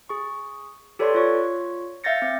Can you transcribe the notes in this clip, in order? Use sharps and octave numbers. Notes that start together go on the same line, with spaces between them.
G#4 C#6
G4 A4 B4 C#5 D5 C6
F4 C#5 C#6
E5 F5 G6 A6 A#6 C#7
C4